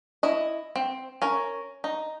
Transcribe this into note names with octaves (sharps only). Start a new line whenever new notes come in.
E4 D#5
C4
C#4 A#4
D#4